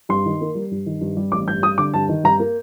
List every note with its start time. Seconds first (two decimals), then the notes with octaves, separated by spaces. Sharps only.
0.09 G2 C6
0.26 D#3
0.41 A#3
0.55 G3
0.71 G2
0.86 D#3
1.01 G2
1.17 G3
1.32 A1 D6
1.48 G2 G6
1.62 G3 D#6
1.78 D3 D6
1.94 G2 A5
2.09 D#3
2.24 G2 A#5
2.40 A#3